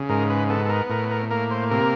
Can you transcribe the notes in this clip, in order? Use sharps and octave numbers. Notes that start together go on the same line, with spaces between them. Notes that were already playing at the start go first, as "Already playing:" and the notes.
Already playing: C#3
G#2 A#4
B4
B3 A4
A4
A#4
A2 A#4
A#4
A#3 A#4
C5
C3 A#4